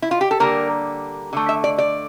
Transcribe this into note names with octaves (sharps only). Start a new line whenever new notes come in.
E4
F4
G4
A4
D3 G3 A#3 A#4
D3 A3
E5
D5
D5